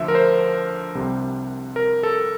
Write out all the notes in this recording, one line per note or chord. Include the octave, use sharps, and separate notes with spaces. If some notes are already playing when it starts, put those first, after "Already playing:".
Already playing: D2 D3 F3 E5
A#4
C5
C2 C3 G3
A#4
A4